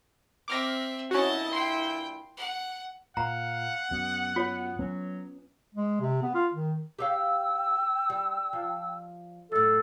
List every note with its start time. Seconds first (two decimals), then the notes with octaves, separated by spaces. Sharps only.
0.48 C4 E5 D6 F6 A#6
1.11 G2 A#2 C#4 E4 F#4 D#5 A5
1.53 G5 C6
2.37 F#5
3.17 A#2 F5 F#5 A#5
3.91 F#2 B3
4.36 B3 F4 C#5
4.79 F#3 B3 C#4
5.75 G#3
6.00 C3
6.22 B3
6.34 F4
6.53 D#3
6.99 G4 C#5 F5 G5 E6
8.10 G3
8.53 F3
9.52 F#2 A2 A4